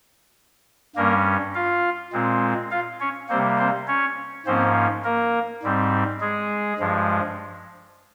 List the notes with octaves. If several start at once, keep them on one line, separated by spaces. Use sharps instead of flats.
G2 G3 A#3 C#4 A#4
F4 F5
A#2 G#3 C4
F4 F5
C#4 C#5
C3 G3 A#3 C4 C5
C4 C5
C#4 C#5
G#2 F3 A#3 C4 C#4 C5
A#3 A#4
G#2 G3 C4
G#3 G#4
G2 F3 G#3